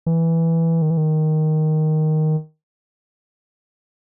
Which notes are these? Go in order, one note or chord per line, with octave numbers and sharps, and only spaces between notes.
E3
D#3
E3
D#3